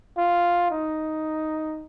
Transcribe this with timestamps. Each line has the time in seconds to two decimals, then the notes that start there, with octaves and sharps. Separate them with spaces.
0.17 F4
0.71 D#4